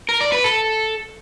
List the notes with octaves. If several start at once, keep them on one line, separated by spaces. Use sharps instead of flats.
A#4
D5
B4
A4